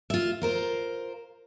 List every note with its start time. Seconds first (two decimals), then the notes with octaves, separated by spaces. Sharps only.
0.10 F4 E5
0.42 F4 A#4 C5